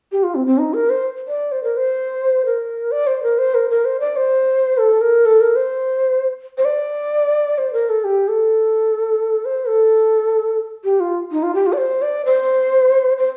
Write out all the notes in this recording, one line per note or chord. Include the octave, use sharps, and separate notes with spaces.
G4
F4
C4
C4
D#4
A#4
C5
D5
C5
A#4
C5
A#4
D5
C5
A#4
C5
A#4
A#4
C5
D5
C5
A4
A#4
A4
A#4
C5
C5
D5
C5
A#4
A4
G4
A4
C5
A4
G4
F4
D#4
F4
G4
F4
D5
C5
D5
C5
C5